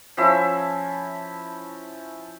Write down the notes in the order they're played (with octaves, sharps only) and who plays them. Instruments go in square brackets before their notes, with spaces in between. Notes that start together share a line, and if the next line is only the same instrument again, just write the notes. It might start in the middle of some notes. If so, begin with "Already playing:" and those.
[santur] F3 C#4 E4 E5